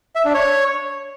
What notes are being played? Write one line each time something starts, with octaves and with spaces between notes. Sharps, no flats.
E5
D4
C#5